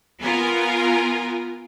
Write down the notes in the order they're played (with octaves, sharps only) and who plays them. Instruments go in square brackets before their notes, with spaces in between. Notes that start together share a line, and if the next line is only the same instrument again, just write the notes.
[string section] B3 F4 A#4 G#5